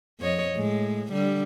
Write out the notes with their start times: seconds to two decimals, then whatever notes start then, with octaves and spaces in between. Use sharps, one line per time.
0.20 F2 C#5 D#5
0.55 A2 G#3
1.12 D3 G3